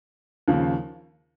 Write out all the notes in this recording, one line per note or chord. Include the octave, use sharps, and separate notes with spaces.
D#2 C#3 F3